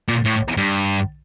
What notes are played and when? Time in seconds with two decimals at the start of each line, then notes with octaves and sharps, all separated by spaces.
0.08 A#2
0.25 A2
0.57 G2